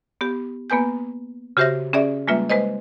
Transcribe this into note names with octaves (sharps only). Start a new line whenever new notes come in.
B3 G4
A#3 B3 B4 G#5 G6
C#3 F#4 G4 C5 E5 A#6
C#4 G#4 D5 E5
G3 G#3 A#3 F4 B4 E5
G#3 B4 C5 D#5